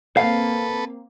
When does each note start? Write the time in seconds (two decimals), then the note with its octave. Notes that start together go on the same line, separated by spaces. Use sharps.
0.17 A#3 C4 A4 B4 F5